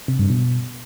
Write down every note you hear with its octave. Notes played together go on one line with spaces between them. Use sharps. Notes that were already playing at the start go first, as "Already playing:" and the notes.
C3
G2
B2